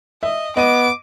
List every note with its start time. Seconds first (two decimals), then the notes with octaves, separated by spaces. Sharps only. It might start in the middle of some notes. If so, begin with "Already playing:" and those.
0.23 D#5 E5
0.57 B3 D#5 D6 D#7